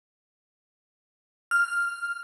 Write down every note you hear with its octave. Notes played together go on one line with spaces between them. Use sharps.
F6